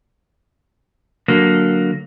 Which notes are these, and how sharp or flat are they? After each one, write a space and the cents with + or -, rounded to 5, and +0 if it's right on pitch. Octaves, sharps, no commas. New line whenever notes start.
D3 +0 F#3 +0 A#3 +0